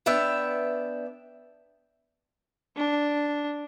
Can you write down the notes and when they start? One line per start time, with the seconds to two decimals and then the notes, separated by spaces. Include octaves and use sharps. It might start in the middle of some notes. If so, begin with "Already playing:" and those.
0.06 B3 D4 E5 G5
2.77 D4